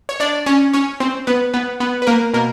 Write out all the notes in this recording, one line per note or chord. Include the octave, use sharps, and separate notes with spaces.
C#5
D4 D5
C#4 C#5
C#4 C#5
C4 C5
B3 B4
B3 B4
B3 B4
B4
A#3 A#4
B2 A#3 A#4